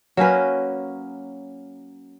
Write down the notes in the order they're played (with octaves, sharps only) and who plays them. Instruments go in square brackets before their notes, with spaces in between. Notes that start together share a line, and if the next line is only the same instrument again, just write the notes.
[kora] F#3 A#3 C#4 B4